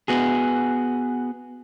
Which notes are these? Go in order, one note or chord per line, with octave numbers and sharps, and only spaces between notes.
B3 F#4 G#4